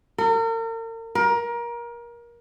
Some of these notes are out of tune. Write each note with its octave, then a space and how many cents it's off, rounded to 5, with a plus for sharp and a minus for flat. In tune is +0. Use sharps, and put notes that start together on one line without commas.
A#4 -40
A#4 +25